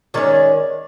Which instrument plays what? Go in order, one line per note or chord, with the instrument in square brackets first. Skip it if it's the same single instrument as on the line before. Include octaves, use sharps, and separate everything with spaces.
[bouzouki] D#3 G#3 C#4 D5